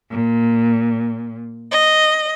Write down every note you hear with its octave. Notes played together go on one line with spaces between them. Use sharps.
A#2
D#5